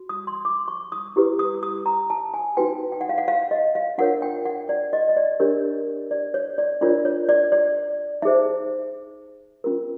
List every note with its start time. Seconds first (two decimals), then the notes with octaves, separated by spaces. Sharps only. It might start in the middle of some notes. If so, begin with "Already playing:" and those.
Already playing: F#4
0.09 D#6
0.27 C6
0.45 D6
0.68 C#6
0.92 D#6
1.16 E4 G4 B4
1.39 D#6
1.63 D#6
1.86 A#5
2.10 A5
2.34 G#5
2.57 D#4 F#4 B4 G5
2.92 G5
3.01 F#5
3.09 F5
3.18 F#5
3.28 F5
3.51 D#5
3.75 F5
3.98 D4 F4 A#4 C#5 F#5
4.22 G5
4.45 F#5
4.69 D5
4.93 D#5
5.09 D#5
5.17 D5
5.40 D4 G4 A#4 C#5
6.11 D5
6.34 C#5
6.58 D5
6.81 D4 F4 A#4 C#5 D5
7.05 C#5
7.29 D5
7.52 D5
8.22 D#4 G#4 C5 E5
9.64 C#4 F4 A#4